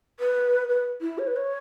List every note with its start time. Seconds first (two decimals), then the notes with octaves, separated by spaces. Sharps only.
0.20 B4
0.69 B4
1.01 E4
1.18 C#5
1.27 B4
1.36 C#5